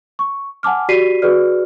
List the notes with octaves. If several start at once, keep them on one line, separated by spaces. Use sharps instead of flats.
C#6
F#5 G#5 A5 D6 F6
F#4 G4 D5 B6 C7 D#7
F#4 G#4 B4 D5 F6